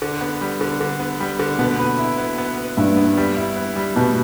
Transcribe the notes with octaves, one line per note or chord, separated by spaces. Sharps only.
D3
B3
G3
D3
D3
B3
G3
D3
B2 B3
B4
E4
B3
B3
B4
G2 E4
B3
G3
E4
B3
G3
B2 G3